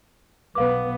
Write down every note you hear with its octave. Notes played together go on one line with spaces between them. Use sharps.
B1 B3 B4 F5 D6